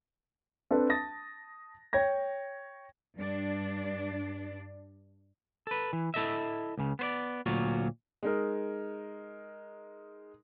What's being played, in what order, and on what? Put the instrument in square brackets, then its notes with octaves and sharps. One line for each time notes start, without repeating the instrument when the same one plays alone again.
[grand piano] C4 D4 A4 B4
A5 D#6 A6 A#6
C#5 G5 G#6 A#6
[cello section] G2 D4
[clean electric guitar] A4 B4
E3
E4 A4 D#5 E5
C#2 C#3
B3 C5 D5
D2 A#2 F#3 F4 F#4
[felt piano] G#3 D#4 A#4